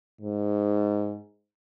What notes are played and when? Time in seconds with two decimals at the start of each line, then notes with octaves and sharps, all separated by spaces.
0.21 G#2